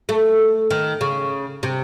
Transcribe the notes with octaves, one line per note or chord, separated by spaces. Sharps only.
A3
D#3
C#3
C3